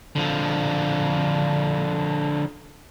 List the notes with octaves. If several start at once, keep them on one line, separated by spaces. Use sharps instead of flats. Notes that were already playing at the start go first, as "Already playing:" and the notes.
D3 F3